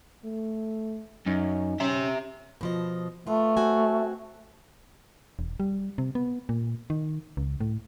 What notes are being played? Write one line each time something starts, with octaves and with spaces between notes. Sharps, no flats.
A3
F#2 D#4
C#4 G4 E5
B2 F3 D#5
A3 B3 F4
C4 F#4 G#5
E1
G3
C3
B3
A#2
D#3
C#2
A2